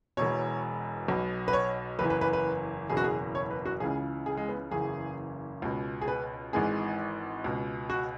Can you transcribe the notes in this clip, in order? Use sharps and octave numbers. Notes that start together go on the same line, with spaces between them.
E1 E2 B2 C#5
B1 B2
B4
C#5
F#1 E2 E3 B4
B4
B4
B4
F#1 E2 B2 G#4
F#4
G#4
C#5
B4
F#4
C#2 C#3 E3 G#4
G#4
G#3
B3
F#1 E2 C#3 E3 G#4
C#2 B2
G#4
B4
G#1 G#2 E3 G#4
C#2 B2
F#4